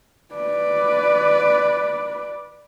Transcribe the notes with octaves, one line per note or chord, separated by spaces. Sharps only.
B4 D5